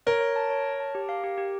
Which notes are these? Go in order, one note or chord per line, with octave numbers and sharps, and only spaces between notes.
A#4 C#5
C#5
A5
C#5
C#5
A5
G4
F5
G4
G4